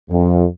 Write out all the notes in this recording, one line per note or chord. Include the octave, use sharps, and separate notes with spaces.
F2